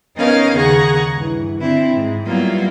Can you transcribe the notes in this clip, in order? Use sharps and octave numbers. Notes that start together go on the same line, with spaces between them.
B3 C#4 D#4 A#4 D#5 F5
D#2 C#3 G#4 F#5 A#5 C#6
G2 E3
D3 C4 E4
G#2
F#3 G3 A#3 B3 E4 F4